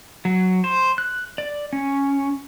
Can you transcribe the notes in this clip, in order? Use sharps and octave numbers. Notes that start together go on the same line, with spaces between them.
F#3
C5
F#6
D5
C#4